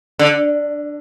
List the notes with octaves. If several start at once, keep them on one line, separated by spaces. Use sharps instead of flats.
D3